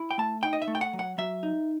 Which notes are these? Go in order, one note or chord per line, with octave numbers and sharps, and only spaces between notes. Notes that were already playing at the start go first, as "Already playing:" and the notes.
Already playing: E4
G5
A3 A5
D#4 G5
D#5
E5
A3
G5
F#5
F#3
F#5
F#3 E5
D#4